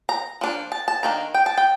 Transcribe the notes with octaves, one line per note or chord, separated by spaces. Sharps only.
A#5
F3 A#3 D4
A5
A5
D#3 A#3 D4 A#5
G5
A5
G5